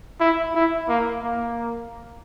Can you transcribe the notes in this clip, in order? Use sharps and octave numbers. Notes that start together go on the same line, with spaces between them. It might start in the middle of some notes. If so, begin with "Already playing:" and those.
E4
E4
A#3
A#3